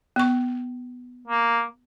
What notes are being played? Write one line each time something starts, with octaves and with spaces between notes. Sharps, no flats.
B3 C#6
A#3